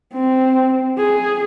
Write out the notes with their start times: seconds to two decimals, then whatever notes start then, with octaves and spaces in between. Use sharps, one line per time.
0.14 C4
0.98 G#4